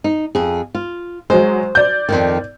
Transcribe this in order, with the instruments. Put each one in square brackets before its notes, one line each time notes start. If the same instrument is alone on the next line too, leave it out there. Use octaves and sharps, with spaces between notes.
[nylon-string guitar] D#4
F2 G#4
F4
[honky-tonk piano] F#3 G#3 [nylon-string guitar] C5
[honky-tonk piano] D5 G6
[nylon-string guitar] F2 G#2 D#3